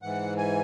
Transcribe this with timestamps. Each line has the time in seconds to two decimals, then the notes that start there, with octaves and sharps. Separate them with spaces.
0.02 G#2 E3 F#5
0.38 G#5